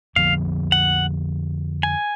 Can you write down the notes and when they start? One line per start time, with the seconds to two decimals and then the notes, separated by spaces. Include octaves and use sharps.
0.16 F2 D3 F3 B3 F5
0.72 F#5
1.83 G#5